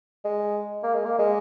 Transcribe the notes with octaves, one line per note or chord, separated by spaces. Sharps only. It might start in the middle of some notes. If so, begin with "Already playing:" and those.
G#3
A#3
G#3
A#3
G#3